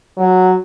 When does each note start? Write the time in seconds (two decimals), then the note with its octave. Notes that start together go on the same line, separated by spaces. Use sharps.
0.18 F#3